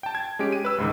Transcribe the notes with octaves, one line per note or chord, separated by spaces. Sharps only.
G5 A5
G#6
G#3 C#4 G4 D7
D#7
B4 E6
C#2 G#2 D#3